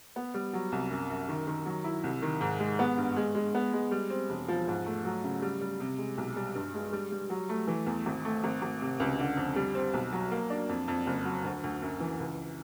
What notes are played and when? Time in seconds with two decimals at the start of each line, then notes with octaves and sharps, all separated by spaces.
0.16 B3
0.34 G3
0.53 F#3
0.72 C2
0.91 F#2
1.10 F#2
1.28 D#3
1.47 D#3
1.66 F#3
1.84 E4
2.04 C2
2.22 D#3
2.41 G#2
2.60 G#3
2.79 B3
2.98 G2
3.17 G#3
3.35 G#3
3.55 B3
3.73 G#3
3.91 G3
4.10 C4
4.29 E1
4.48 F3
4.68 G#2
4.86 A3
5.05 F#3
5.24 C#3
5.42 G3
5.61 G3
5.80 C3
5.98 G#3
6.18 B1
6.36 G3
6.55 G2
6.74 G#3
6.92 G3
7.12 G3
7.30 F#3
7.49 A3
7.67 E3
7.86 E2
8.06 G#1
8.25 A3
8.44 G#1
8.62 G#1
8.81 C3
9.00 C#2
9.19 D3
9.37 F2
9.56 G3
9.75 C4
9.94 B1
10.12 F#3
10.31 A#3
10.50 D4
10.69 F2
10.88 F2
11.07 F#1
11.25 F#3
11.44 D2
11.64 D2
11.82 F#2
12.00 E3
12.20 C#2